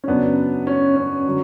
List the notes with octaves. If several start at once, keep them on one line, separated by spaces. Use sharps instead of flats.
C#4
F#2 C#3 F#3 B3 D4
C#4
C#4
D3 F#3